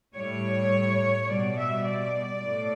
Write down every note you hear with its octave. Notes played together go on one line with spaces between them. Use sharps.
A2 G3 C#5
B2 G3 D5
E5
D5
A2